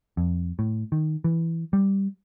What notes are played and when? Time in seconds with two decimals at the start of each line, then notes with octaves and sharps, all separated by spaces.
0.17 F2
0.59 A2
0.92 D#3
1.24 E3
1.73 G3